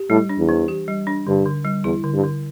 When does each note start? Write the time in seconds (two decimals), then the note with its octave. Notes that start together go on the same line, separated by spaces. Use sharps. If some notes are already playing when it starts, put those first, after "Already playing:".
Already playing: G4
0.10 A2 G3
0.29 D4
0.39 E2
0.49 E3
0.68 G4
0.88 G3
1.07 D4
1.27 G2 D3
1.46 D3
1.65 G3
1.84 E2 E4
2.04 D3
2.14 G2
2.23 D3